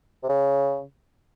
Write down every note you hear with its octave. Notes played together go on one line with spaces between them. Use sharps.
C3
C#3